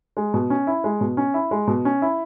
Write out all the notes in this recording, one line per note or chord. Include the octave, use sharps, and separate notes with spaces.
G#3
B2
C#4
E4
G#3
B2
C#4
E4
G#3
B2
C#4
E4